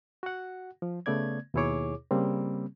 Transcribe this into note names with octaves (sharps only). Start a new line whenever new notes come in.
F#4 F#5
F3
C#3 A3 B3 D5 G#6
D#2 B2 E4 G#4 C#5 D6
C#3 G3 A#3 C4